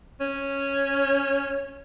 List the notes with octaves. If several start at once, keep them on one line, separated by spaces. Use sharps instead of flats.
C#4